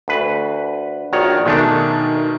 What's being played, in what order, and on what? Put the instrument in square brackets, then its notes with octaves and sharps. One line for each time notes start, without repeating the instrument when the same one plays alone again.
[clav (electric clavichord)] D2 B4
[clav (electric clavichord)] A#1 D#3 C#5 [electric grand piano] F#4 D5
[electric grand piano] B2 D#3 [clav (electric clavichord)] G#3 A3 D4